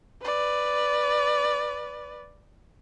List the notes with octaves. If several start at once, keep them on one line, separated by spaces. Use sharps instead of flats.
B4 D5